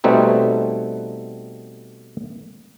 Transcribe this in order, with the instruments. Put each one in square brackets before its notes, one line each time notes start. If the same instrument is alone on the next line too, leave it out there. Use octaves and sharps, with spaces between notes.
[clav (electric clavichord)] B2 G3 A3 C4 D#4